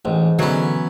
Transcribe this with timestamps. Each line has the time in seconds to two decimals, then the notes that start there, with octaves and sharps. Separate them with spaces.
0.05 A1 G#2
0.39 D3 E3 F#3 B3 C#4